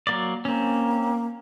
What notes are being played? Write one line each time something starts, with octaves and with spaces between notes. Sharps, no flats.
F#3 A#3 D5
A#3 C4 C#4